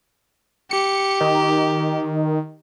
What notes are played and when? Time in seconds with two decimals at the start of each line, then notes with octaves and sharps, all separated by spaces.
0.71 G4 C#7
1.21 D#3